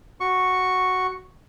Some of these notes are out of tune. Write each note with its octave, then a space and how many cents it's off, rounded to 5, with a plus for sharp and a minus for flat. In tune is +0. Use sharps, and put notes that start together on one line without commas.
F#4 +0 C#6 +0